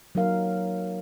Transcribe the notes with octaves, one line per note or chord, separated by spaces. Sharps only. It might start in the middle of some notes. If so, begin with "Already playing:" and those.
F#3 A#3 D#4 A#4 F5